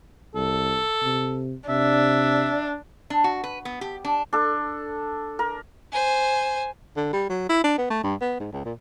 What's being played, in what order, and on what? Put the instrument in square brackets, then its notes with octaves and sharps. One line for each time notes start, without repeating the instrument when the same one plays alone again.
[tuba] C2 [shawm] A4
[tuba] C3
[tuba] C3 [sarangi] D4 [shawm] E5
[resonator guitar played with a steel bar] D4
F#4
B4
B3
G4
D4
[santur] D4 A4
A#4
[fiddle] C5 G#5
[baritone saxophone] D3
G3
F#3
E4
D4
B3
A3
G2
B3
G#2
C#2
A#2